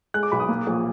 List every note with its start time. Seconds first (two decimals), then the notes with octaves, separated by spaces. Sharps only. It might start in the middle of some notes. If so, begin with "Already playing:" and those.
0.14 G#3 F#6
0.23 D6
0.32 B1 B5
0.40 D#6
0.49 A#3
0.67 A#1